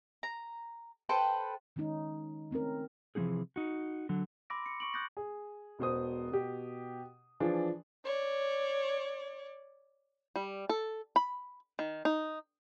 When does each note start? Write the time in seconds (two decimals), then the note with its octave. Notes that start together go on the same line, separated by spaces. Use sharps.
0.23 A#5
1.09 A4 B4 C5 G5
1.76 D#3 G#3 C#4 D#4
2.51 A3 C4 C#4 A#4
3.15 C3 E3 F3 A#3 D#4 G#4
3.56 D#4 F#4
4.09 D3 F#3
4.50 B5 C6 D6 E6 A#6 D7
4.66 C#7
4.80 C#6 D7 F#7
4.94 D#6 F#6 G6 A6 A#6
5.17 G#4
5.79 E1 B2 C5 D#6
6.32 B2 G4
7.40 E3 F3 D4 G#4
8.06 C#5 D5
10.36 G3
10.69 A4
11.16 B5
11.79 D#3
12.05 D#4